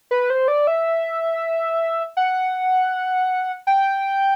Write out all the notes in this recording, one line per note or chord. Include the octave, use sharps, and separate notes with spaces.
B4
C5
D5
E5
F#5
G5